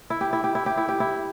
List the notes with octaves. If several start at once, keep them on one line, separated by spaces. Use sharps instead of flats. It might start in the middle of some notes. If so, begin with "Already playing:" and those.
E4
G4
E4
G4
E4
G4
E4
G4
E4